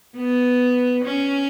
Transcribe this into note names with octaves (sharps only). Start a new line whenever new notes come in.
B3
C#4